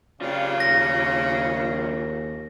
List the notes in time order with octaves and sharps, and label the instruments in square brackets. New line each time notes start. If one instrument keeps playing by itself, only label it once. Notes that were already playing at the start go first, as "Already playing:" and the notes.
[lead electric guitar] B1 F4 [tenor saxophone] C#3 [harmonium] G4 D5 F5
[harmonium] D#2 [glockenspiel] A#6